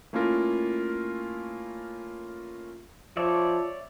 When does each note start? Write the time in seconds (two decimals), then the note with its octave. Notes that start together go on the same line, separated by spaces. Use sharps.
0.13 A3 A#3 C#4 E4 F4 A#4
3.17 F3 C#5 D5 E5